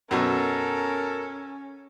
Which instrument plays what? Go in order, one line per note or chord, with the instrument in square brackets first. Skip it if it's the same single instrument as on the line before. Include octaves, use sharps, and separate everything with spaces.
[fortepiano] F#2 B2 [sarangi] C#4 [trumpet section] A4 [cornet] A#4